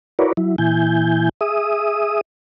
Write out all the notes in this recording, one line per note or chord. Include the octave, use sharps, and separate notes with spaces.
E4 F#4 A#4 B4 C#5 D5
F#3 E4
A#2 E3 E4 G#5 G6
G#4 E5 D#6